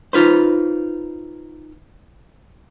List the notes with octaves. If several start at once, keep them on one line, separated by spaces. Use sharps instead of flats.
D#4 F4 B4 C5